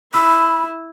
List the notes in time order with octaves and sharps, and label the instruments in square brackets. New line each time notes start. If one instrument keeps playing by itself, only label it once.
[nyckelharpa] E4 [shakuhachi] B5 [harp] E6